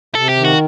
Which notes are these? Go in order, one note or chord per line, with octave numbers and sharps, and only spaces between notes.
C3 A4
G4
D#3
F#4